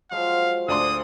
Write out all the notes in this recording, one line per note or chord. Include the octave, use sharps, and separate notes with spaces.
F3 F#3 G#3 F5
D2 G#2 D4 C6 D#6